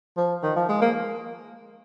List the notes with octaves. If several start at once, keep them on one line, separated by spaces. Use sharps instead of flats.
F3
D#3
F3
G#3
A#3